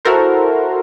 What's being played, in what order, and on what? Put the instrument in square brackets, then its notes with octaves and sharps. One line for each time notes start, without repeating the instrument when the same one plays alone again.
[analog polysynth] E4 F#4 A4 A#4 C5